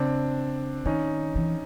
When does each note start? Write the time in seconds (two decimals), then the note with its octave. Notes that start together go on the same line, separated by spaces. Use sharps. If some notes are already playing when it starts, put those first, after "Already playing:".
Already playing: C#3 C4 D4
0.85 D#3 C#4 D#4
1.36 E3